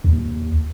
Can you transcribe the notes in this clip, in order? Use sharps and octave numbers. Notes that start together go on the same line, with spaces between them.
D#2